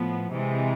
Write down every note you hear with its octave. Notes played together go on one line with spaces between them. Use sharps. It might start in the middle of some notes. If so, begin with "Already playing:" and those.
Already playing: A2 F3 B3
C3 E3 G#3